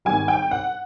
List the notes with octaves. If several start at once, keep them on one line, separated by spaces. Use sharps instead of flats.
G#1 G#2 D#3 G3 G#5
G5
F#5